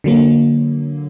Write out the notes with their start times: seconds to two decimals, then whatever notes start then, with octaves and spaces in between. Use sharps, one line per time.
0.04 D3 F#3 A#3